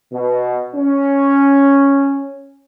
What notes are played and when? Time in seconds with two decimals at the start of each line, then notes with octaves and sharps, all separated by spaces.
0.12 B2
0.75 C#4